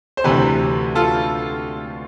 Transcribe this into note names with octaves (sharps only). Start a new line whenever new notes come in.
C5
D2 C3 E3 G4 B4
F4 A4